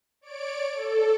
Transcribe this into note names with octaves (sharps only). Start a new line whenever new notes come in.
C#5 D5 D7
A4